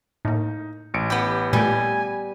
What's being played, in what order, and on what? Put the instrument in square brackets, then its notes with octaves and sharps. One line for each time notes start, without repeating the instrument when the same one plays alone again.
[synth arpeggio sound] A2 A#3 [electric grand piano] D#4
[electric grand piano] A1 C#7 D7
[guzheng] B3 G4
[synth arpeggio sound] A#2 A3 G4 [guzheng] G3 [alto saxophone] G#5